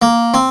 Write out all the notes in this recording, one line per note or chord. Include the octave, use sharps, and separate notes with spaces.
A#3
C4